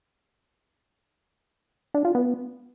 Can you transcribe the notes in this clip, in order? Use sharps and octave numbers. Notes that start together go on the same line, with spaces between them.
D4
F4
B3